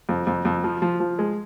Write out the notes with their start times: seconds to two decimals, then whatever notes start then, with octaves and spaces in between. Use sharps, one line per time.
0.09 F2
0.27 F2
0.45 F2
0.64 F3
0.82 F3
1.00 F3
1.19 G#3